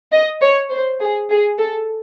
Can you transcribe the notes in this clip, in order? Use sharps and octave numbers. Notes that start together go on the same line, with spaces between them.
D#5
C#5
C5
G#4
G#4
A4